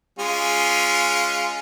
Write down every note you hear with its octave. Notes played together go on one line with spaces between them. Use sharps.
G#3 C#4 F4